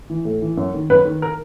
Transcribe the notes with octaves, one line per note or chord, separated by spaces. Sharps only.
E3
A2
E3
F#2
D#3
F#2 B4
D#3
A#4